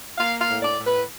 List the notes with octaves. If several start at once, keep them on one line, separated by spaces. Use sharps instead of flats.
A#3 F5
F5
A2
D5
A2
B4